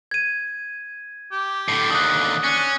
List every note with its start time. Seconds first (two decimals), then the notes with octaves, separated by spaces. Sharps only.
0.11 G#6 D#7
1.32 G4
1.69 A2 D3
1.91 D#2 D3 D#6 F#6
2.44 C#4 D4